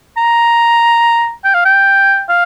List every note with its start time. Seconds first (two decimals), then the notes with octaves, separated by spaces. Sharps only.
0.17 A#5
1.45 G5
1.54 F5
1.65 G5
2.29 F5